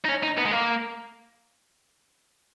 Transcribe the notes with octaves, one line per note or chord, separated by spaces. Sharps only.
D#4
C#4
D#4
B3
G#3
A#3